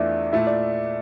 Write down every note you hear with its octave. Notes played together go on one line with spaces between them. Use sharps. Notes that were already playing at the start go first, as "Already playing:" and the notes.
Already playing: E2 E3 A3 D4 F4 D5 E5
A#2 A3 E4 E5
D5